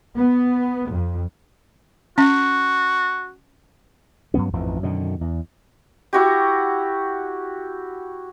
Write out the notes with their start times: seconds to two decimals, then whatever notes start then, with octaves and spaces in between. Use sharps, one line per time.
0.16 B3
0.91 F2
2.18 C#4 F#4
4.34 G2 F#3 B3 C#4
4.53 A1 F2 G#2 E3
4.83 F#2 B2 D3 D#3
5.21 E2
6.13 E4 F#4 G4